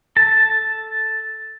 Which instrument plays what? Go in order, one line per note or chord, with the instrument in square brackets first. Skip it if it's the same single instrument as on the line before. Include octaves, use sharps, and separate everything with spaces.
[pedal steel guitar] A4 A5